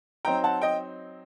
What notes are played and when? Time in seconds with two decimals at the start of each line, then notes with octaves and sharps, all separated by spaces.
0.25 F#3 C4 D#4 G5 A#5
0.44 F#5 A5
0.61 D#5 G5